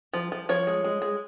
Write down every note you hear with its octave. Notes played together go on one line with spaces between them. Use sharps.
F3
F3
F3 C#5
G#3
G#3
G#3